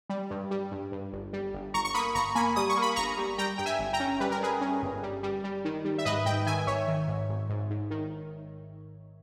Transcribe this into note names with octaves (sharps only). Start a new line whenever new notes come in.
G3
G2
G3
G2
G2
G1
G3
G1
G1 A#5 C#6
C#6
A#3 B5 D#6
G1 A#5 C#6
A#3 G#5 B5
G3 D#6
C#6
A#3
B5
G1 A#5 C#6
G3
G3 G5 A#5
G2 G5
E5 G#5
G1
G5 A#5
C#4
G3 B4
A#4
G3 G#4 B4
C#4
G1
G3
G3
G3
D#3
G3
E5
G#2 B4 D#5
G#2 D#5 G5
D#3 E5 G#5
G#1 C#5 E5
D#3
G#2
G#1
G#2
G#2
D#3